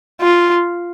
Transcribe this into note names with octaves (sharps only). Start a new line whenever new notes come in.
F4